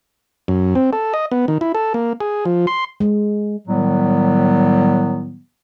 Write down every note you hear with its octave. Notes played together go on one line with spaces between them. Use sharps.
F#2
C4
A4
D#5
B3
D#3
E4
A4
A#3
G#4
F3
C6
G#3
A2 D#3 F#3 G3 B3